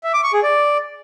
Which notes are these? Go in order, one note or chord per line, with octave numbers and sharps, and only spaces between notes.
E5
D6
C#6
G#4
D5